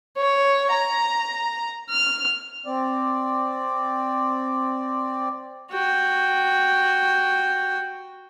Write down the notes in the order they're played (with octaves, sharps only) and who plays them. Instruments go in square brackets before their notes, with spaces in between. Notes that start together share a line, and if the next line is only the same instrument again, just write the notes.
[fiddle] C#5
A#5
F6
[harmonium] C4 D5
[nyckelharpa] F#4 G5